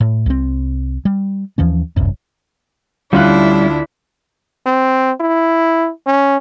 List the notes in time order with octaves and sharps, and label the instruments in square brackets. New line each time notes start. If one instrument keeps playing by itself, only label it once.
[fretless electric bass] A2
C2 C4
G3
D#2 E3 F3 C#4
D1 G1 C2 F#2
[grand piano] D2 F4 F#6 [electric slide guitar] G3 C#4 [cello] D4 E4
[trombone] C4
E4
C#4